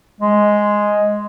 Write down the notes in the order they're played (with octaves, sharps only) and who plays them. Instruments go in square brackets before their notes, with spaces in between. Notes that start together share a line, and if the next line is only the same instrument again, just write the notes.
[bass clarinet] G#3